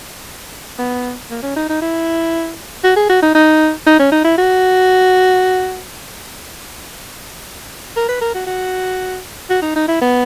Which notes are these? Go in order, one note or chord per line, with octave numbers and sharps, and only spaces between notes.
B3
A#3
C#4
D#4
D#4
E4
F#4
G#4
F#4
D#4
D#4
D#4
C#4
D#4
E4
F#4
A#4
B4
A#4
F#4
F#4
F#4
D#4
D#4
E4
B3